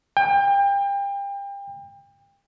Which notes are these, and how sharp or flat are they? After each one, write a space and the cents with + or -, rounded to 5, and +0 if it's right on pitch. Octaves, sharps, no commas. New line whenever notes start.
G5 +30